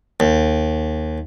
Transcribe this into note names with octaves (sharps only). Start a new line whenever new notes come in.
D#2